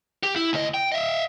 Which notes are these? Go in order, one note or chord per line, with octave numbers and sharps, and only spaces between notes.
G4
E4
D2 D#5
G5
D#5 E5